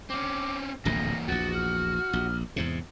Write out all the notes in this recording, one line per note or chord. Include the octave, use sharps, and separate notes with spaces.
C4 C#4 D6
D1 A#1 F2 E3 A#3 A#6
A#1 E2 F#4 A6
F6
A#1
E2 G#2 C3